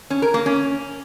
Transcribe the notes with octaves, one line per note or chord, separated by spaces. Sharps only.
C#4
A#4
A#3
C#4